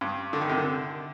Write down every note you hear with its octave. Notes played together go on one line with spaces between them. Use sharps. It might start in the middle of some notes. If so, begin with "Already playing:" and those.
G2
D3
D#3
C3
D3